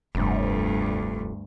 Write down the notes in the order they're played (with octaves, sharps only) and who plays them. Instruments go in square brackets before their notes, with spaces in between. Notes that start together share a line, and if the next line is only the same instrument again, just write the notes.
[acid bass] F1 [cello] D2 G2